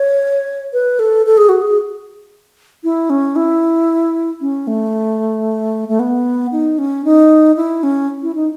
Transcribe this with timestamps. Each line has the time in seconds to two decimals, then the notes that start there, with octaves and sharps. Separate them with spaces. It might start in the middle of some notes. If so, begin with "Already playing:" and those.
Already playing: C#5
0.73 B4
0.99 A4
1.26 A4
1.37 G#4
1.49 F#4
1.62 G#4
2.84 E4
3.10 C#4
3.36 E4
4.41 C#4
4.67 A3
5.89 A3
5.99 B3
6.52 D#4
6.78 C#4
7.05 D#4
7.56 E4
7.83 C#4
8.23 E4
8.35 D#4